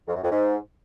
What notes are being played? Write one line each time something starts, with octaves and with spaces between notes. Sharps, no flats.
F2
F#2
F2
G#2